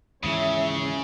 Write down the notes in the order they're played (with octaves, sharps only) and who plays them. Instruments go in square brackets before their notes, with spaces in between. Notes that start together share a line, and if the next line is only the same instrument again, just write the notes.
[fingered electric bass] D#2 G#2 E3 [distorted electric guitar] C#3 [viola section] C#5 E5